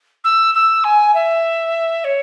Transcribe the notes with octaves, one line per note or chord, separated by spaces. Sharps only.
E6
E6
G#5
E5
C#5